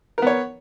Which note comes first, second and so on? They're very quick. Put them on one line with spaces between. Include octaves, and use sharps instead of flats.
A#4 B3 C#5